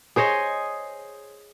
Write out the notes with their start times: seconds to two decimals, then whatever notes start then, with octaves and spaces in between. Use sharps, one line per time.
0.16 G#4 C5 C#5 D#5